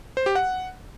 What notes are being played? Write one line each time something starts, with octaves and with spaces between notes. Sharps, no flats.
C5
G4
F#5